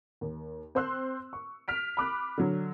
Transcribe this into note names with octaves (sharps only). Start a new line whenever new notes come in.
D#2
C4 C5 C6 E6 F#6
C#6
F6 B6 D7
B5 D6 F#6
D3 F#3